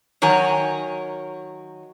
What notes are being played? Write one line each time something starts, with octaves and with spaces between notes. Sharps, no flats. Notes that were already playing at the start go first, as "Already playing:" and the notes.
D#3 F#3 A#4 C#5 G#5